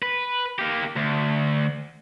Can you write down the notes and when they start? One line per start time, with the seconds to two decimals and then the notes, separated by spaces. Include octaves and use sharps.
0.02 B4
0.59 A#3 G4
0.96 D2